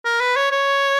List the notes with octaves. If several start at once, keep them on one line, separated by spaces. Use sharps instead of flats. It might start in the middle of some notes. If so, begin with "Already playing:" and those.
A#4
B4
C#5
C#5